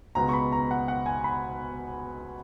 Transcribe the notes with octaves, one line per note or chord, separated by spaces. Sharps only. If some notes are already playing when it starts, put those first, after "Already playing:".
C#2 B2 G#3 B3 A#5
C#6
B5
A#5
F#5
F#5
G#5
B5